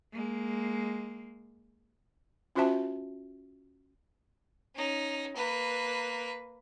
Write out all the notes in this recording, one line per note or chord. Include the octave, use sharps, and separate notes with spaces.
G#3 A#3
C#4 F4 F#4 C5 E5 A5
C#4 D#4
A#3 B4